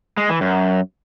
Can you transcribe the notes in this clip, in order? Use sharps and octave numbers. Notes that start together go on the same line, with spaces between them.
G#3
E3
F#2